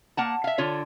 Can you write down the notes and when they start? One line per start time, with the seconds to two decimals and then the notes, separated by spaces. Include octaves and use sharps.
0.17 A#3 F#5 A5
0.44 E5 F5
0.58 D3 F4 C#5